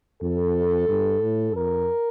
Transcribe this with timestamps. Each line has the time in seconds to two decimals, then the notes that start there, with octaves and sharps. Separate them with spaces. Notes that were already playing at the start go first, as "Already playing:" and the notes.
0.22 F2 A4
0.89 G2
1.22 A2
1.56 F2 A#4